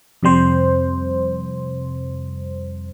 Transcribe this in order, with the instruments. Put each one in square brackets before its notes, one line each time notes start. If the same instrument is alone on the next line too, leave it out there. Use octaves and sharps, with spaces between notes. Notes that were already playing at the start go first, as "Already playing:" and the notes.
[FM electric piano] F2 C3 G3 C5